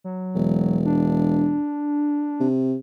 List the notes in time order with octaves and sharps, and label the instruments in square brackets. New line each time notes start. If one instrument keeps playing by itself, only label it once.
[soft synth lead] F#3
[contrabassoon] E1
[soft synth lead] D4
[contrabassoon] C3